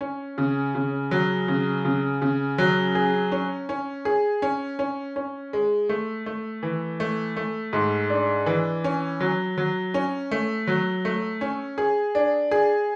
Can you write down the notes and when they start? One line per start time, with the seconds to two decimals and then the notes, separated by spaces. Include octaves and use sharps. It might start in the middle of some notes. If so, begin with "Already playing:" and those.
0.01 C#4
0.38 C#3
0.75 C#3
1.11 F#3
1.48 C#3
1.85 C#3
2.22 C#3
2.58 F#3
2.95 G#4
3.32 C#4
3.69 C#4
4.05 G#4
4.42 C#4
4.79 C#4
5.16 C#4
5.53 G#3
5.89 A3
6.26 A3
6.63 E3
7.00 A3
7.37 A3
7.73 G#2
8.10 D4
8.46 E3
8.84 C#4
9.20 F#3
9.58 F#3
9.94 C#4
10.31 A3
10.67 F#3
11.05 A3
11.41 C#4
11.78 G#4
12.15 D4
12.51 G#4